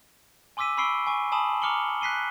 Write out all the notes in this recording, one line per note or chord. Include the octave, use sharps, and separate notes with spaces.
G#5 C6 D6 E6 B6 D#7
B5 C#6 E6 C7 D7 G7
G#5 C#6
G#5 A5 B5 D#6 E7 F#7
A#5 D6 F6 C#7 F#7 G7
F#6 B6 C7 D#7 G7